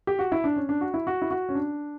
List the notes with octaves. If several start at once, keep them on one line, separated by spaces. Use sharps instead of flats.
G4
F#4
E4
D4
C#4
D4
F#4
E4
F#4
E4
F#4
C#4
D4